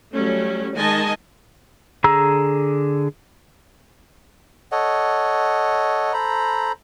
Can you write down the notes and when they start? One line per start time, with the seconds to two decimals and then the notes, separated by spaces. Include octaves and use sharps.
0.13 F#3 G3 A3 C#4
0.75 D#3 G#3 D#4 D#5 G#5 A5
2.04 D3 G#4 A#5 E6
4.72 A4 C#5 D#5 F#5
6.13 A4 C5 A#5 B5